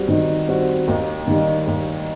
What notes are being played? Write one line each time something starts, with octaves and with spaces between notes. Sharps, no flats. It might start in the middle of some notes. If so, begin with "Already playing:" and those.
Already playing: G3 C4 F#4
D#3
G3 C4 F#4
D#2
D#3 G3
D#2